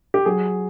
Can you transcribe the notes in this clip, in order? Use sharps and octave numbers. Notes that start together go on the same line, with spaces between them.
G4
F#3 G#4